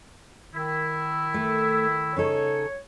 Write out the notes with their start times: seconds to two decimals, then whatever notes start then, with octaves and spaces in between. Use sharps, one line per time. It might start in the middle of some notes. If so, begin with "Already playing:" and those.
0.54 D#3 E4
1.34 A3
2.17 C#3 D#4 A4 C#5